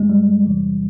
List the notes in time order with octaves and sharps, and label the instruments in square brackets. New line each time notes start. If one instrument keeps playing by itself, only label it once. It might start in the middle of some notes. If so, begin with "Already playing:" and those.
Already playing: [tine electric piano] G2 D#3 G#3 A3
G3
E2 C3 E3